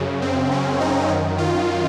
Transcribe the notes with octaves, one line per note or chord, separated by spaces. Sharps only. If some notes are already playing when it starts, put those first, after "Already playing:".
Already playing: F#2 C#3
C4
C#4
D#4
F#2 D#3
F4